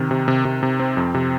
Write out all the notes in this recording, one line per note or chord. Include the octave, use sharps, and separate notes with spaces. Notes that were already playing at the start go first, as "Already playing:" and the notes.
Already playing: C3 D#3
C3
C3
C3
C3
C4
F2
C3